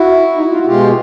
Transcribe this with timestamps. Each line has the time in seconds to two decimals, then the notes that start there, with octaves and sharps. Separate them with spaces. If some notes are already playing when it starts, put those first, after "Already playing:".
Already playing: E4 F#4
0.36 D#4
0.43 E4
0.51 F4
0.58 F#4
0.66 B2 G#3 F4 G4